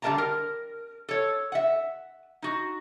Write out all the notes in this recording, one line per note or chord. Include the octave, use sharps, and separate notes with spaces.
D3 G3 A#4 E5 A5 A#5
A#4
A4 C#5
E5 F#5
D#4 F#4